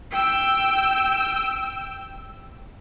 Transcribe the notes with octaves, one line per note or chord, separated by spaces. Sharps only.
G5 E6